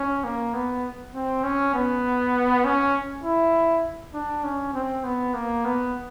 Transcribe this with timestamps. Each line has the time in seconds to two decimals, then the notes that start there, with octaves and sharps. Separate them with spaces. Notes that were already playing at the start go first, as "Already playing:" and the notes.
Already playing: C#4
0.24 A#3
0.54 B3
1.15 C4
1.44 C#4
1.74 B3
2.65 C#4
3.24 E4
4.14 D4
4.44 C#4
4.74 C4
5.04 B3
5.34 A#3
5.65 B3